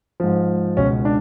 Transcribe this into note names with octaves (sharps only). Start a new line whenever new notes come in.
G#2 F3
C#2 B2 C#4
D4